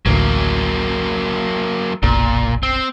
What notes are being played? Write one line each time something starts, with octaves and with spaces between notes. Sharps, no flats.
A1 D2 F#3 A#3
F#1 B1 A#2
C4